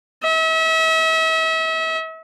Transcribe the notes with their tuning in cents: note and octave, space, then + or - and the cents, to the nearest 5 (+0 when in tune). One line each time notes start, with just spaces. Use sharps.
E5 -35